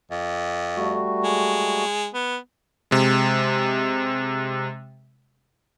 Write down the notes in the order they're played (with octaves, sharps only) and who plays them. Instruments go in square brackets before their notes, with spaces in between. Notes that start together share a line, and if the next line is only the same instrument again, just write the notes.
[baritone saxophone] F2
[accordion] G3 A3 F#4
[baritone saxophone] G#3
B3
[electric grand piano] C3 G#3